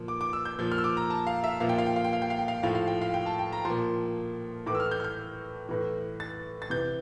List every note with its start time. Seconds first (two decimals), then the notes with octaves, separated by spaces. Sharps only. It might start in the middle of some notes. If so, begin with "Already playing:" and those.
Already playing: A#2 F3
0.08 D6
0.21 D6
0.33 E6
0.45 G6
0.58 A#2 F3 G6
0.72 F6
0.78 E6
0.84 D6
0.97 A#5
1.10 A5
1.27 F5
1.44 E5
1.60 A#2 F3 F5
1.69 G5
1.78 F5
1.86 G5
1.96 F5
2.04 G5
2.13 F5
2.22 G5
2.30 F5
2.39 G5
2.48 F5
2.63 A2 F3 F5
2.75 F5
2.88 G5
3.01 F5
3.14 G5
3.26 A5
3.39 G5
3.52 A#5
3.65 A#2 F3 C6
4.66 A2 E3 D6
4.75 E6
4.80 F6
4.91 G6
5.00 F6
5.04 G6
5.69 A2 E3
6.20 A6
6.62 A6
6.70 C3 E3 G6